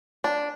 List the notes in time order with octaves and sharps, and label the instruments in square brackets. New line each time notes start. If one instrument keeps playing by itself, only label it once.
[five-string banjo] D4